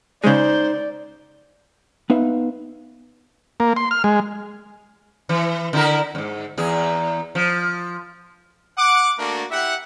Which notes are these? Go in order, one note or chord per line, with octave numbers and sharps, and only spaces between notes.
C#3 G#3 D#4 C5 D5
B3 D#4 B4 E5 F5
A#3
C6
F6
G#3
E3
D3 E4 A#4
E2 G#2
E2 G#4
F3
F#5 D6
A3 A#3 D4 F#4 A#4
E4 G4 E5 F#5